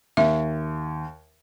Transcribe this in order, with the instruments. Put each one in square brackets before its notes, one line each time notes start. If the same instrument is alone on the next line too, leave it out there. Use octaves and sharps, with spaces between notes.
[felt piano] D#2 [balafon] E5